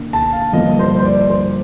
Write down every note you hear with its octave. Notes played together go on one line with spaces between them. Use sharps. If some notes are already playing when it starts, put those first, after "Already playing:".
Already playing: D3 A#3 D4
A5
F5
G2 D3 F3 A#3 D4 D#5
C5
C5
D5
C5